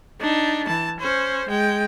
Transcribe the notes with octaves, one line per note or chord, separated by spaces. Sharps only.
D4 D#4
E3 A5
C#4 C5
G#3 G5